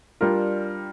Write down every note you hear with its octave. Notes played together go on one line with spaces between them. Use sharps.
G3 D4 F4 A#4